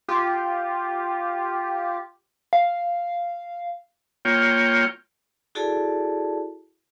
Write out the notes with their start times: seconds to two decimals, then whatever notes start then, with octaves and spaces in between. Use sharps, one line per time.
0.08 F4 G4
2.53 F5
4.25 A#3 F4 C#5 G5
5.55 E4 F#4 G#4 A4 D5 A5